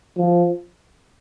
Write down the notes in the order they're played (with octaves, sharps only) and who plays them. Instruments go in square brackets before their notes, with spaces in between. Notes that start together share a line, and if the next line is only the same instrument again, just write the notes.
[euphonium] F3